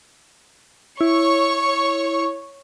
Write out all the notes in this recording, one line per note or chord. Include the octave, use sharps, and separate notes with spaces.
E4 C#5 C#6